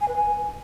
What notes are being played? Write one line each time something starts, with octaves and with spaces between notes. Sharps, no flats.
G#5
B4
G#5